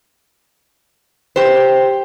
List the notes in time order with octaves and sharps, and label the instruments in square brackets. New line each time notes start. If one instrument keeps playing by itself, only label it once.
[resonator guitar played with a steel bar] G4 C5